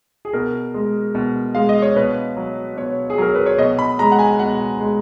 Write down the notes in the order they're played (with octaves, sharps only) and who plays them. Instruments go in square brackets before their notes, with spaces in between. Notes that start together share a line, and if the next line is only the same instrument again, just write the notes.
[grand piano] G#4
B2 A#4
G#3
B2
G#3 F5
D#5
C#5
B2 B4
F#3
B2 C#5
G#4
F#3 A#4
B4
C#5
B2 D#5
B5
G#3 A#5
F#5
G#5
B2 F#5
G#3